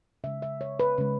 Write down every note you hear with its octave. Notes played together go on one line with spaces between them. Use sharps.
C#3 G#3 E5
E5
C#5
B4
C#3 G#3